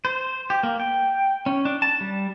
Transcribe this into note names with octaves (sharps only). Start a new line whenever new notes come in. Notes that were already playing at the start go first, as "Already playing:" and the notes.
C5
G4
A#3
G5
C#4
D4
A5
G3